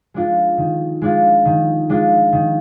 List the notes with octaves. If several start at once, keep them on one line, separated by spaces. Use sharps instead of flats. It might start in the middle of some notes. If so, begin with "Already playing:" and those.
G#3 D4 F4
D#3
G#3 D4 F4
D#3
G#3 D4 F4
D#3